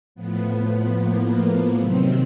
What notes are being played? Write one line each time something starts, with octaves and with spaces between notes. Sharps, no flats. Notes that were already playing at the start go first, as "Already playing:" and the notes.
A2 F3 B3
A#3
C3 D#3 F#3 C4